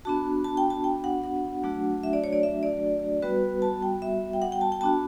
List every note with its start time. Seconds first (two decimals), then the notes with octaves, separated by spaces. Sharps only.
0.05 B3 D4 F#4 A5
0.44 A5
0.57 G5
0.70 A5
0.84 G5
1.04 F#5
1.24 F#5
1.63 F#3 A3 D4 F#4
2.03 E5
2.13 D5
2.24 C#5
2.33 D5
2.43 E5
2.63 D5
3.22 G3 B3 F#4 B4
3.62 A5
3.82 G5
4.02 E5
4.33 G5
4.42 F#5
4.52 G5
4.61 A5
4.72 G5
4.81 B3 D4 F#4 A5